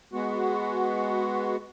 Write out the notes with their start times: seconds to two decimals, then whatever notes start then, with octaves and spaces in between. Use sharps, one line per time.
0.13 G#3 B3 F#4